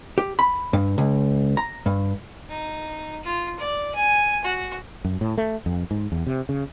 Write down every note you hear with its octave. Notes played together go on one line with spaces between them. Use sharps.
G4
B5
G2
C#2
A#5
G2
D#4
F4
D5
G#5
F#4
F#2
A2
A3
F2
G#2
E2
C3
C#3